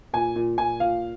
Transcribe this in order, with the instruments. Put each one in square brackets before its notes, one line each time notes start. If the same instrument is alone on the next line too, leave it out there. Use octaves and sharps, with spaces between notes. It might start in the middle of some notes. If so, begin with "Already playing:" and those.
[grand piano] A#2 G#5
A#2
A#2 G#5
A#2 F5